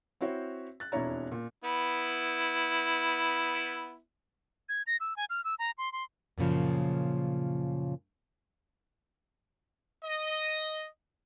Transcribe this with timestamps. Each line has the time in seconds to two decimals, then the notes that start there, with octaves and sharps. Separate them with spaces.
0.21 C4 E4 F#4 C5 C#5
0.80 F#6 A6
0.92 E1 F2 D4 E4 C#5 A#5
1.32 A#2
1.64 B3 E4
4.69 G#6
4.87 A#6
5.00 E6
5.17 G#5
5.30 F6
5.44 E6
5.59 A#5
5.78 C6
5.93 C6
6.38 F#2 A#2 C#3 F3
10.05 D#5